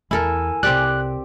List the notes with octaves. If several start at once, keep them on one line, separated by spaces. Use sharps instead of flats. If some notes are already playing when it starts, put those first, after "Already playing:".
E2 E4 A4 A#4 G#5
C2 C4 G4 D5 F#6